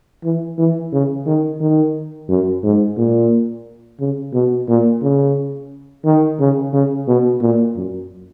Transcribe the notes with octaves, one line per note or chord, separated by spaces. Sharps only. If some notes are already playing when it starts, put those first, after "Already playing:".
E3
E3
C#3
D#3
D#3
F#2
G#2
A#2
C#3
B2
A#2
C#3
D#3
C#3
C#3
B2
A#2
F#2